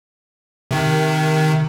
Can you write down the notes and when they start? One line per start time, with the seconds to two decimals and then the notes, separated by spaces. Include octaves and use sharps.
0.71 C3 D#3